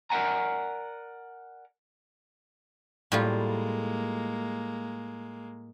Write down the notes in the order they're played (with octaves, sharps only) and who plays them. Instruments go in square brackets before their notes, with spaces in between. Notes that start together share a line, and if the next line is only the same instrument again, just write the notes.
[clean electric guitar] A#4 D5 E5 F#5 G#5 A#5
[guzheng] A2 G3 F4 [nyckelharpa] G#3 A#3